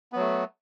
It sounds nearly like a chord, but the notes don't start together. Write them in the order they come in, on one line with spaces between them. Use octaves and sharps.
B3 F#3 A3